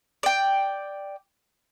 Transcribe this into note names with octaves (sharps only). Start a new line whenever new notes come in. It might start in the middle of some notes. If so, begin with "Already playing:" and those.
D5 G5